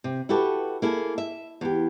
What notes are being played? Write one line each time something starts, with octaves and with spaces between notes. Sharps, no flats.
C3
E4 F#4 G4 A4 B4
A#3 E4 G#4 A4
E5
E2 G4